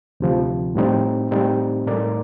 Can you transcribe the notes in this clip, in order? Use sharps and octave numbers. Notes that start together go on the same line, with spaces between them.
D2 C3 F3
A2 G3 C4 D#4
A2 G3 C4 D#4
A2 A3 D#4 A#4 D5